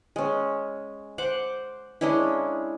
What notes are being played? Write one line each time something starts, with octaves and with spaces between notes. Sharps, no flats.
G#3 C#4
C5 F#5 D6
G#3 C#4 D4 E4